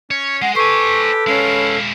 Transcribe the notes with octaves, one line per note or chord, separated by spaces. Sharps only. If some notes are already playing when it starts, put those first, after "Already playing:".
C#4 C#5
G#3 F#5
G4 A4 B4 C5 G#5 C#6
G#3 C#4 E4 F5